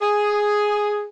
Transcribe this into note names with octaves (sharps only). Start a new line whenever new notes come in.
G#4